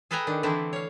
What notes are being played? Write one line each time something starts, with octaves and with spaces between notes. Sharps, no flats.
G#4 A4 B4 G5 G#5 A#5
D#3 D4
D3 E3 A3 C4 D4 E4
C#5 F5